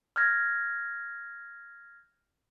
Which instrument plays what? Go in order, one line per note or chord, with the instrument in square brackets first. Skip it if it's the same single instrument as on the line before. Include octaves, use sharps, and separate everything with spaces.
[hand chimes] F6 G6 G#6 A#6